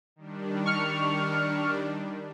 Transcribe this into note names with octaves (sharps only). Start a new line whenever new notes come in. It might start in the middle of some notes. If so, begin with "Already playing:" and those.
D#3 G3 D4
C#6 F6 C#7